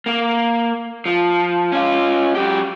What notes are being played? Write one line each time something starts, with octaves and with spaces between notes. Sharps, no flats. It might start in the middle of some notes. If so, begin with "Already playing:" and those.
A#3
F3
C#4 F4
F#3 G4